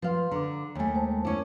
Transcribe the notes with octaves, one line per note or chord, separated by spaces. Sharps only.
F3 B4 F5 C6
D3 A#5 D6
D#2 A3 G5 G#5
G#3 C5 A5
C#4 E4 A#4 D6